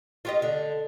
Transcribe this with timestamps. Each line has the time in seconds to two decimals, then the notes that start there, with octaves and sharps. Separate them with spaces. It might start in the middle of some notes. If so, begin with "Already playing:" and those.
0.25 F4 G4 D#5
0.42 D3